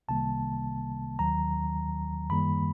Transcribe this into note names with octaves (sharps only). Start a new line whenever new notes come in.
C2 C3 D#3 G3 A#3 A5
D#2 D#3 F#3 A#5
F#2 D#3 G3 A#3 B5